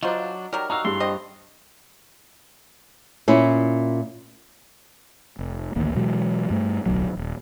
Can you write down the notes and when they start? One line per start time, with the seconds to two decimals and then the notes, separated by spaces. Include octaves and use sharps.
0.03 F#3 D4 F4 C5 D#5 A#5 E6
0.19 F5
0.53 D#3 F#3 G3 A#4
0.70 D#4 F#4 F5 A#5 E6
0.85 G2 E4 G#4 C6
1.00 D3 C4 D#5
3.28 A#2 C#4 E4
5.39 F1
5.76 A1 D2 D#3 A#3
5.95 B2 E3 F#3 G#3
6.50 G2 A3
6.86 D1 B1 D3 F#3
7.17 D#1